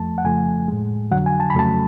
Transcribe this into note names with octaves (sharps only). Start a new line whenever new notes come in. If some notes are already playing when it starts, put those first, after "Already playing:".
Already playing: F2 F3 A3 A5
F#5
F2 C#3 F3 A3 G#5
A2 G#3
F2 D3 F#3 F#5
G#5
A5
B5
F2 C#3 F#3 A3 A5